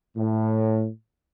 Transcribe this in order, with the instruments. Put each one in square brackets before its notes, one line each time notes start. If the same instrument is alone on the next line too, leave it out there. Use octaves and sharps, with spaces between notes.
[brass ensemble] A2